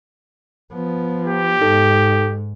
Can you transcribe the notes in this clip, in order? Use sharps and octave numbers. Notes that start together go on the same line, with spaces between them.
F3 B3
G4
G#2 D#4 A4